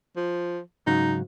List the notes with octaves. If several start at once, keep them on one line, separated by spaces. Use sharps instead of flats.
F3
G#2 C#3 F#3 D#4